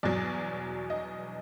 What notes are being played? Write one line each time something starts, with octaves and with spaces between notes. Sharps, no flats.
E2 B2 F#3 D5
D#5